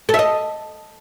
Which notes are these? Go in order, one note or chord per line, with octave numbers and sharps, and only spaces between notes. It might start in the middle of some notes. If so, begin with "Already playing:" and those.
A4
E5
D#5